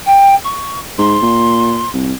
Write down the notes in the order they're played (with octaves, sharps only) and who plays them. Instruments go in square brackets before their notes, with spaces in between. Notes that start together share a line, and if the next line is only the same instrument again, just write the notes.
[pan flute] G5
C#6
[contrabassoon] G#2 [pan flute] C6
[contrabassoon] A#2
C2